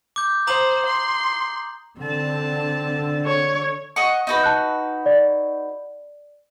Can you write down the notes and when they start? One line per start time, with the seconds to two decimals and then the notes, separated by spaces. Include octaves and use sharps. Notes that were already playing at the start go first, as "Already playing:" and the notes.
0.16 D6 G6
0.47 C5 A#5 D#6 F#7
0.86 C6
1.99 D3 C4 A5
3.26 C#5
3.96 D#5 F#5 C#6
4.27 D#4 F#4 B4
4.44 A5 F#6
5.06 D5